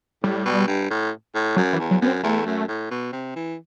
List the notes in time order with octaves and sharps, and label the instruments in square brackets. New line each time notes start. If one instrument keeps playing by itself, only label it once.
[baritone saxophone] A2 [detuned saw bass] G3
[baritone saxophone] B2
G2
A2
A2
[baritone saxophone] F#2 [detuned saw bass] F#3
[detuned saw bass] E3
[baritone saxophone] E2
[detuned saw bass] F#3
[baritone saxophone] F#2 [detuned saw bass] B3
[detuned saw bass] C4
[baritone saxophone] E2 [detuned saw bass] A3
[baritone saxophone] F#2
A2
B2
C3
E3